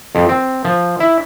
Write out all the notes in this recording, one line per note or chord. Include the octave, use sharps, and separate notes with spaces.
F2
C4
F3
E4